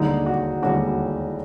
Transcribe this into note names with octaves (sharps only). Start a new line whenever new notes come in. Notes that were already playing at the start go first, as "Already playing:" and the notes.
Already playing: E1 D#2 D3 G3 D#4
F#4
E1 D#2 D3 G3 F#4